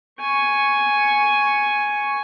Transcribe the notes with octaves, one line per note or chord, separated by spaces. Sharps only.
G#5 C#6